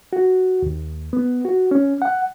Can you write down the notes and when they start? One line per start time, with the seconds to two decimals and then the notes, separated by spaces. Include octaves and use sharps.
0.13 F#4
0.62 D#2
1.13 B3
1.45 F#4
1.71 C#4
2.02 F#5